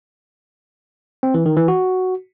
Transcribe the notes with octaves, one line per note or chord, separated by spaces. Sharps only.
C4
E3
D#3
E3
F#4